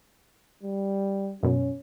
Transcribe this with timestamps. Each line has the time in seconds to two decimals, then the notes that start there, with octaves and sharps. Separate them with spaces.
0.63 G3
1.43 F#2 B2 C#4